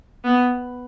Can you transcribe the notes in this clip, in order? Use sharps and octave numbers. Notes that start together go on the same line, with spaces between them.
B3